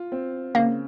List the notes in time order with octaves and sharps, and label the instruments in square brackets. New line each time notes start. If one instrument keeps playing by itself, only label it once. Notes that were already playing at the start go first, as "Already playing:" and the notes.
Already playing: [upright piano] F4
C4
[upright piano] C#3 [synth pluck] A#3